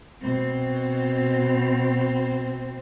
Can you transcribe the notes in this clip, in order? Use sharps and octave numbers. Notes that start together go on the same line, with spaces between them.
B2 C4